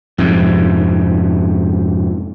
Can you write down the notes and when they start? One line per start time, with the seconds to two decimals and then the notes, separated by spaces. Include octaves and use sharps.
0.18 F2 G#2 C3